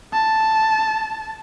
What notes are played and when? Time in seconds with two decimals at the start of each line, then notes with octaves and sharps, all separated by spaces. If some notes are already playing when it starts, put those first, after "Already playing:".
0.13 A5